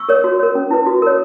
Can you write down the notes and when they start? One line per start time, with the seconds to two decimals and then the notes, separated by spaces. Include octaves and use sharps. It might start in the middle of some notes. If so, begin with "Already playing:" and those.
Already playing: C#6 E6
0.09 A#4 C#5
0.24 F#4
0.39 A#4 C#5
0.55 C#4
0.71 E4 B4
0.86 F#4
1.02 A#4 C#5